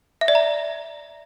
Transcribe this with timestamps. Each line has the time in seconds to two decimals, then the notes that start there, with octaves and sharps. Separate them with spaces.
0.21 E5
0.28 D5
0.35 A#5